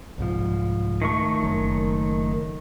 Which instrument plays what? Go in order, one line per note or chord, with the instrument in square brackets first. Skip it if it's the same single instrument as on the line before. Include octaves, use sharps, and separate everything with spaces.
[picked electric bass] C2 G#2 F3
[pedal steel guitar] D#3 A3 C#6
[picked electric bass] F#1 F#2